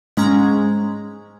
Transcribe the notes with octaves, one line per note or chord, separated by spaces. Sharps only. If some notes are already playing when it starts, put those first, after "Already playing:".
G#2 G#3 C#4 A#5 G#6